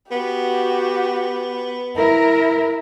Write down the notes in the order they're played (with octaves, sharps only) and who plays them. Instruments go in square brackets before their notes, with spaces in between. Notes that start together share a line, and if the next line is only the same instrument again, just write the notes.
[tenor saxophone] B3 [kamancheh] F#4 G4
[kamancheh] E4 [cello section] A#4